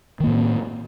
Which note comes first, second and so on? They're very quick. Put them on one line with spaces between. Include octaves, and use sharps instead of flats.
D#3 A#3 A2 C4